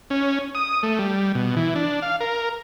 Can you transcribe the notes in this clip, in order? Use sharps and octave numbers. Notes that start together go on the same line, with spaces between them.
C#4
D#6
A3
G3
B2
E3
D4
F5
A#4